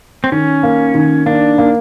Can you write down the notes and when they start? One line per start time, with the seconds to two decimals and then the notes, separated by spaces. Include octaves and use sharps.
0.24 C4
0.32 D#3 C#4
0.63 A#3
0.94 D#3
1.26 A#3 D4
1.58 A#3